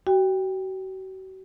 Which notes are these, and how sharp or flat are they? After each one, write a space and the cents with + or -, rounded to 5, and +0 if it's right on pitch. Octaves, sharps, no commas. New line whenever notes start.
F#4 +40 G5 +20